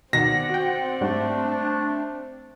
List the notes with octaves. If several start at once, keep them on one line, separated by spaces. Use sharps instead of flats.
B2 D#3 C4 D5 F#5 A#6
F#4 G5
G#2 G3 A3 D4